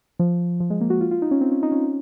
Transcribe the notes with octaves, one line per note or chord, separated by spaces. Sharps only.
F3
F3
G#3
A#3
F#4
F4
F4
D#4
C#4
C4
C#4
D#4
C#4